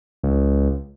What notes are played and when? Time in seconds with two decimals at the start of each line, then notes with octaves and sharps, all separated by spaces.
0.23 C#2